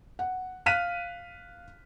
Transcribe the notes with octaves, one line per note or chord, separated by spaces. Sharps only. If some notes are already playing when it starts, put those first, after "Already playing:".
F#5
F5 F6 F#6 B6 D#7